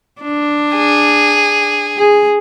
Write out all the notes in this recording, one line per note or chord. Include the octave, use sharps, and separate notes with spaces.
D4
G#4
G#4